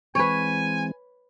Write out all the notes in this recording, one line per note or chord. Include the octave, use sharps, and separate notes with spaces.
E3 G#3 C4 B4 C#5 G#5